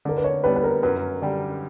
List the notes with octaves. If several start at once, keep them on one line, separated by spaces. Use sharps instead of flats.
D3 A#4
B4
C#5
G3 B3 D4 B4
B4
A#4
F#2 B4
D3 G3